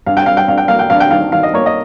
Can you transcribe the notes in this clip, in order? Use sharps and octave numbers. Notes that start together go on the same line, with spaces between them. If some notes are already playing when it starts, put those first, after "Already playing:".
G2 F5
G5
G2 F5
G5
G2 F5
G5
A#3 F5
G5
G2 F5
G5
D#3 F5
D#3 F5
D#5
A#3 C#5
D#5